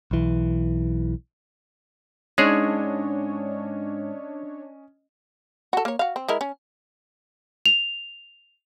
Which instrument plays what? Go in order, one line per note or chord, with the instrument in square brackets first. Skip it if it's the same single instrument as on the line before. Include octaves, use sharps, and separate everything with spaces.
[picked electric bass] B1 E3
[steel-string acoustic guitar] G#2 [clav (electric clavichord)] G#3 G#4 [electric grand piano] C#4 D#5 [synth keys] D4 C#5
[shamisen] F#4 A4
A#3 C#5
F#4 F5
C4
G#3 E4 A#4
C#4
[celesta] F7